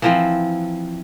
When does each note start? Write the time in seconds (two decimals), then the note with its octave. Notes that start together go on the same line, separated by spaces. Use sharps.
0.02 E3 F3 C4